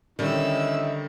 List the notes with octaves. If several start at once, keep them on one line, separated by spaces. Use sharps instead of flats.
D3 D#3 G3 C#4 D#4 E4 E6